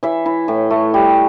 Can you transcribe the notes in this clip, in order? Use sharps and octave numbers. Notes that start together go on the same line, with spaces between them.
E3 E5
E4
A2
A3
G3